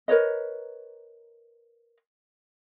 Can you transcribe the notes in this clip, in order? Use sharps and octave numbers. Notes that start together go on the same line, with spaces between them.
A#4 B4 C#5 D#5